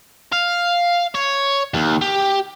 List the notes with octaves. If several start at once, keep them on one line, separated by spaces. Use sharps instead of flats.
F5
C#5
D#2
G4